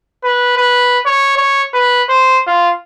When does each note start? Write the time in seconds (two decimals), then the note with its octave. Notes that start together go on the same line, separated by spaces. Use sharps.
0.24 B4
0.57 B4
1.06 C#5
1.37 C#5
1.73 B4
2.09 C5
2.47 F4